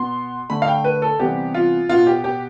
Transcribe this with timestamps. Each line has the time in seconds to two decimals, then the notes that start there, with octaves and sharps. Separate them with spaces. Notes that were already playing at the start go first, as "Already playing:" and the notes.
Already playing: B2 B3 C6
0.50 D3 A3 B5
0.62 F5
0.68 G5
0.84 B4
1.02 A4
1.19 C3 E3 G3 B3 G4
1.54 F4
1.89 B2 B3 F4
2.07 G4
2.24 G4